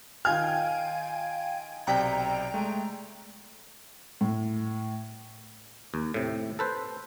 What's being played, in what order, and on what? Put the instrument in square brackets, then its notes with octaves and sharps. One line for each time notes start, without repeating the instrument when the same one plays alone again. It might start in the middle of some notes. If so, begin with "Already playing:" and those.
[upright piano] D#3 F4 F6 [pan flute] F5 [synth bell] G5 G#5 G#6
[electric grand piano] B1 C3 B6 [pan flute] D5 [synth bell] G5 A#5
[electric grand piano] G#3 A3
[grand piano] A2
[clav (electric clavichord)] D#2
A2 C3
A4 B4 C5